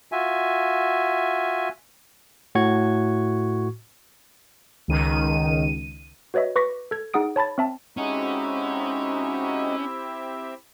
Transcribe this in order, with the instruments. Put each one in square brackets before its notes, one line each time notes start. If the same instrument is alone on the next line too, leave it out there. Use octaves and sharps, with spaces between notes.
[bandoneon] F4 F#4 E5 G#5
[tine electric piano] A2 F#4 C#6 G#6
[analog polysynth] C#2 D#3 D#7
[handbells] F#4 B4 C#5 D#5 E5
B4 C#6 D6 A#6 B6
A4 G#6
D#4 G#4 F#5 D#6 D7
C#5 A5 B5 A6
C4 E5 A5
[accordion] G#3 D#4 F#4 [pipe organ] C4 G4 E5 [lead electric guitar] C#4 [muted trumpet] E4